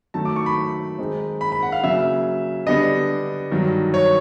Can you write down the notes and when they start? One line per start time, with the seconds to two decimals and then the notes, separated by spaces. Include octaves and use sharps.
0.14 D#3 F#3 A3 A5
0.25 D6
0.36 C#6
0.46 B5
0.99 D#3 G#3 C4 D#4
1.41 B5
1.52 B5
1.63 F#5
1.72 F5
1.83 C#3 F#3 A#3 E5
2.67 D3 G3 B3 D4 D#5
3.51 G2 D#3 F#3
3.94 C#5